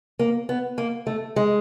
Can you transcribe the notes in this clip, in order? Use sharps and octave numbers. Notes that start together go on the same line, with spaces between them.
A#3
B3
A#3
A3
G#3